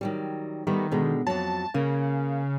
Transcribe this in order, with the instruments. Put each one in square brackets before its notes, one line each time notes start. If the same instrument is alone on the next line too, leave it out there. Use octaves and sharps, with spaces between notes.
[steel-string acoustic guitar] D#3 F#3 G3
[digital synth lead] D#3 [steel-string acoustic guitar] G3 A3 B3
[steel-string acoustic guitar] B2 D3 G#3
[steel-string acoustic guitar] F2 F#3 [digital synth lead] A5
[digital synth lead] C#3 [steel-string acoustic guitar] A#3